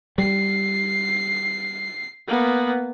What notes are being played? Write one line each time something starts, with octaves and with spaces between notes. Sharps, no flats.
G3 C7
A#3 B3